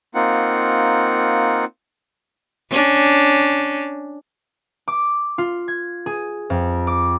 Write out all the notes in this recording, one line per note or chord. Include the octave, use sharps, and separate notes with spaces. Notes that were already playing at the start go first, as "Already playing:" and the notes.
A#3 C4 D#4 F4 F#5
C#4 D4
D6
F4
G#6
G#4
F2
D6